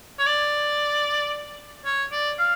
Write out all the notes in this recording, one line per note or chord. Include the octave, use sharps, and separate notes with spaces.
C#5
D5
C#5
D5
F5